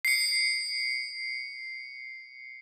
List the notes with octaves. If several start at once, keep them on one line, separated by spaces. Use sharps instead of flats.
C7 C#7